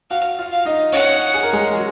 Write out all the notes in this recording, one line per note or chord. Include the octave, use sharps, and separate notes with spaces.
F#4 F5 F#5
F4 F5
F5
D#4 D#5
C#4 C#5 F#5
G#4
A#4
G#3 G#4
F#3 F#4